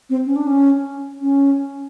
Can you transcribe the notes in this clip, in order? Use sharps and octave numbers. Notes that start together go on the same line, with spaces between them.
C4
C#4
D4
C#4
C#4